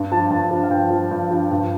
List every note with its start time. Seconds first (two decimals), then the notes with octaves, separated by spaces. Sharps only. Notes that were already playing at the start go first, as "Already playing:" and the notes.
Already playing: G2
0.12 F3 A5
0.31 G2 A5
0.51 F3
0.63 F5
0.70 G2 G5
0.90 F3
1.11 G2
1.31 F3
1.51 G2